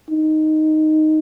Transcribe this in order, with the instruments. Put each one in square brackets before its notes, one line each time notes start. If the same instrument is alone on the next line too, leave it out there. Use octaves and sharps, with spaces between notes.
[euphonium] D#4